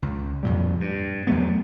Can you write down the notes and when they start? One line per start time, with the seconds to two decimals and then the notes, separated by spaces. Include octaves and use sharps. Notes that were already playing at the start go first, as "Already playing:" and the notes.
0.02 C#2
0.43 F2 A#2 G3
0.80 G2
1.27 E2 F#3 A3 B3